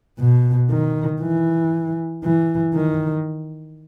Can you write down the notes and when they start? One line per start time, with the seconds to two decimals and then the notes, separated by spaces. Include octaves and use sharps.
0.19 B2
0.70 D#3
1.21 E3
2.24 E3
2.75 D#3